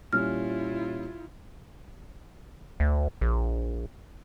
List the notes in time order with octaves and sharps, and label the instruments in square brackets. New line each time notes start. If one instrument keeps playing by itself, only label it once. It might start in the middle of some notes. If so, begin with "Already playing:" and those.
[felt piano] A#2 G3 C#4 [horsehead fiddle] E4 F4 [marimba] F6
[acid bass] D2
A#1